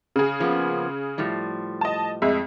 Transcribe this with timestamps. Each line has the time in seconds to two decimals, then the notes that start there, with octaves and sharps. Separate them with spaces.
0.16 C#3 G#4
0.40 F3 A#3 B3
1.18 A2 F3 G3
1.81 D#5 A5
2.22 F2 G#3 E5